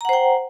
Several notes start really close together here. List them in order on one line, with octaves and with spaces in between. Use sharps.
A#5 F#5 C5 G5